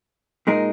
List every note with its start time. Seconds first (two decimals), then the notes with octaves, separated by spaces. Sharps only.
0.47 A#2 G#3 D#4 A#4